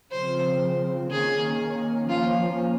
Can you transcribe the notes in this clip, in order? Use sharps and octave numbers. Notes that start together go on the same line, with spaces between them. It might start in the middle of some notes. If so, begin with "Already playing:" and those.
C#3 F3 C4 C5
D#3 A#3 C#4 G#4
F3 A#3 C#4 F4